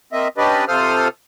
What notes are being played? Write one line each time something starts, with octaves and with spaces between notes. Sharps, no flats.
A#3 C4 D#5 E5
C#4 D4 G4 B4 D5 D#5
C3 F4 A4 C5 D#6 F6